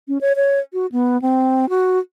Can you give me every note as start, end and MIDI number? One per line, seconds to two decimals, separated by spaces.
0.08 0.18 61
0.21 0.33 73
0.36 0.60 73
0.73 0.86 66
0.92 1.20 59
1.22 1.69 60
1.69 1.99 66